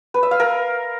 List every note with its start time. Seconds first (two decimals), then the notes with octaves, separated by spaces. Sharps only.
0.14 B4
0.23 E5
0.31 F5
0.40 A#4